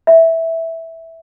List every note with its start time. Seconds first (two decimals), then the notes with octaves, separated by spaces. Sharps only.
0.07 E5